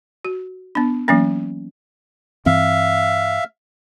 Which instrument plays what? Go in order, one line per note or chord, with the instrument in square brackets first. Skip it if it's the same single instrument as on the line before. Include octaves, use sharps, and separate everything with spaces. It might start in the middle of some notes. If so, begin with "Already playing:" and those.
[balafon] F#4
B3 D4
E3 F#3 A#3 C#4
[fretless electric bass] G2 E3 C4 [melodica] E5 F5